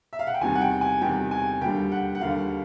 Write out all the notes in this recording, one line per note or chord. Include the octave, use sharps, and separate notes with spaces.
E5
F5
F#5
G5
E2 C3 D#3 G3 G#5
F#5
G5
G#5
E2 C3 D#3 G3 G5
G#5
D#2 D3 G3 G5
F#5
F#5
D#2 D3 G3 F5